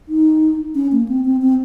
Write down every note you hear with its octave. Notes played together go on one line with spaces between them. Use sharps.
D#4
C#4
A#3
C4
C4
C4